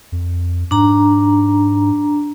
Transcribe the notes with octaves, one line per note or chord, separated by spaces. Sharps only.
F2
G#2 D4 A#5